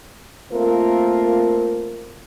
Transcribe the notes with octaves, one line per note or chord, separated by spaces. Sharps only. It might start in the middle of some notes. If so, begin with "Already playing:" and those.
A3 A#3 C4 F4 A#4